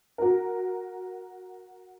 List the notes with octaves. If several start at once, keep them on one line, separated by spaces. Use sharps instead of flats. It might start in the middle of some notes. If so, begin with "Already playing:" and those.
F#4 A#4